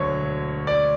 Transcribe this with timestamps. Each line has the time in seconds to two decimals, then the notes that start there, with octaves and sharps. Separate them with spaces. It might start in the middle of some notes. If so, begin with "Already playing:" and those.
Already playing: E1 D2 D3 F#3 C#5
0.67 D5